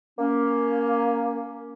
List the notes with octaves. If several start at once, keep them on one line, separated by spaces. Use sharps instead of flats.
A#3 C#4